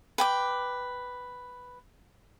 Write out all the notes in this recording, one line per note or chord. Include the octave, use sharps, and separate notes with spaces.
B4 G5 D6